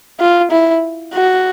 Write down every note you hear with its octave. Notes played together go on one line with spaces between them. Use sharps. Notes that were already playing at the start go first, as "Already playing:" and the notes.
F4
E4
F#4